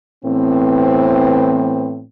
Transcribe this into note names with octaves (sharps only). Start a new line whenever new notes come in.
A2 E3 B3 C4